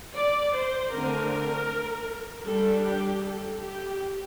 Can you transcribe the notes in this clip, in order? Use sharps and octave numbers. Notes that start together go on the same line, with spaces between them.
D5
C5
D3 A3 C4 A#4
G3 D4 A4
G4
A4
G4